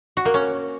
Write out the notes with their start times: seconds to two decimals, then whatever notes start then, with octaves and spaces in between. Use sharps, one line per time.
0.17 F#4
0.25 A#3
0.34 C#4